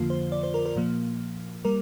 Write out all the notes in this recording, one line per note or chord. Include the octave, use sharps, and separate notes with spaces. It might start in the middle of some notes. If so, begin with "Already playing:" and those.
Already playing: F2 D3 F3 A#3 F4
C5
D5
C5
A#4
A#4
A#2 F3 A#3
G3 A#3 A#4